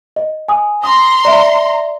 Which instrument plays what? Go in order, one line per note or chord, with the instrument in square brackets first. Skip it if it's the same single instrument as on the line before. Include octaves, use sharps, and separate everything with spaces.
[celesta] D#5
G#5 D#6
[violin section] A#5 C6 [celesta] D#6
[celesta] D5 E5